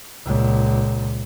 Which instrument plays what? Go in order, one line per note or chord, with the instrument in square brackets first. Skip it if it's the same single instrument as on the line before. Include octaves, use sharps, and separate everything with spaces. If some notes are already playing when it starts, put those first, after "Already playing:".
[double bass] C#2 A#2